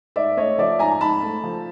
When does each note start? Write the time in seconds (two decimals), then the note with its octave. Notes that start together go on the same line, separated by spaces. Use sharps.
0.16 G#2 D5 E5
0.37 A3 C#5 D#5
0.58 F3 D5 E5
0.79 G#2 G#5 A#5
0.92 A#5
1.01 G#2 A5 B5
1.23 A3
1.43 F3